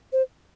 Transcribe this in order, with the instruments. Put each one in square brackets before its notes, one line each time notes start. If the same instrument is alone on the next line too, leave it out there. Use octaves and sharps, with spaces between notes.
[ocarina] C5